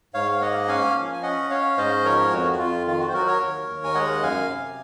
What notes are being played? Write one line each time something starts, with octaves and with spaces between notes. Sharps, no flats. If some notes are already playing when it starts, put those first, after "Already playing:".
G#2 C#5 F5
F5
A#3 D#5 F#5
C#4 F5 G#5
F3
G#5
C#4 D#5 F#5
C#4 C#5 F5
G#2 C5 D#5
F3 A#4 C#5
F2 F#4
F#4
F2 F4
D#3 F4
F#4
C5
F#3 F#4 A#4
A#4 C#5
D#2
D#2
G#5
G#3 D#5 F#5
F#2 F5 G#5
C3